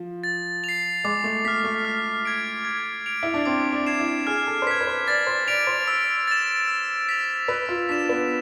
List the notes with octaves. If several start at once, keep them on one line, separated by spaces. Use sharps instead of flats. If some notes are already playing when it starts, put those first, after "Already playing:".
Already playing: F3
A6
C7 F7
G#3 D6
A3
A3 F6 B6
A3
F6
G#6 D7
G#6
D7 F7
E4
D4
C4 D6
D4
G#6 C7 E7
E4
G#4 F6
A4
C5
B4 G#6 B6
B4
C5
D5 A6
C5
D5 D7 F7
C5
E6
A6 E7
E6
B6 F7
B4 E6
F4
D4 B6 E7
B3